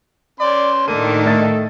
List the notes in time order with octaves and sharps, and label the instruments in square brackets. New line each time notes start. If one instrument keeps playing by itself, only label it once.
[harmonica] C#4 C6 [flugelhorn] D5
[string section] A2 D#3 [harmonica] A#3 D4 [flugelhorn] A4 [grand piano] D#7
[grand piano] A3 D#5 A6